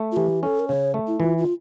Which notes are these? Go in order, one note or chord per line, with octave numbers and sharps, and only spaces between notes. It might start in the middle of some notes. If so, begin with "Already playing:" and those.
Already playing: A3
F4
E3 G4
C#4 A4
A#4
C#3 C#5
A3
E4
E3 F4
F4